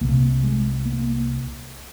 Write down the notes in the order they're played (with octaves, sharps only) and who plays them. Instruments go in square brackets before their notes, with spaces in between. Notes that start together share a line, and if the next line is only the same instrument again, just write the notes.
[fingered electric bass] C2 C3 A#3
G#3
A#3